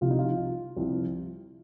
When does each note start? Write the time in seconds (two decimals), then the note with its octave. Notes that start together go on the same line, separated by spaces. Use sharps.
0.01 C2 C3 F3 F4
0.10 D#4
0.19 F4
0.77 C2 C3 F3